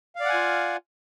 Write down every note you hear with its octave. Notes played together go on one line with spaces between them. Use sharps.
F4 D5 F5 F#5 G#5